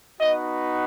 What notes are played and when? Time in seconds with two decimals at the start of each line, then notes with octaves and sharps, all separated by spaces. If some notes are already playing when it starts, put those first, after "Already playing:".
0.20 B3 D#4 F#4 D#5